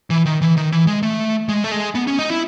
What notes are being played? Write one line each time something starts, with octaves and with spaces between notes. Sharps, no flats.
E3
D#3
E3
D#3
E3
G#3
A3
G#3
A3
G#3
B3
C#4
D#4
E4